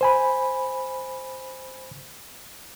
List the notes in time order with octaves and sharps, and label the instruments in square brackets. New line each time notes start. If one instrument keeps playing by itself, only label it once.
[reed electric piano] C5 G#5 B5